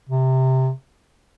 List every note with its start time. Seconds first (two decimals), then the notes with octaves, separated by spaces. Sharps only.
0.09 C3